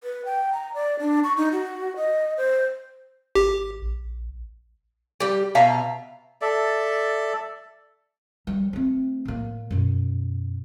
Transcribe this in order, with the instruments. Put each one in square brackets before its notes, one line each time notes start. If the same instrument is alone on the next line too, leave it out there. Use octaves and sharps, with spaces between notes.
[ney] B4
G5
A#5
D5
D4
C#6
D#4
F#4
D#5
C5
[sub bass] G#1 [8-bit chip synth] G4
[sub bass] A#1
[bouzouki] G3 G4
B2 E5 F5 A#5
[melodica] A4 D5 E5
[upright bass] G3
A3 C4
A2 A#3
F#2 B2